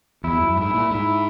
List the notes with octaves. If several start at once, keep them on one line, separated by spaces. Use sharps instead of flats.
E2 E4
F#2
G#2 E4
A#2
G#2 E4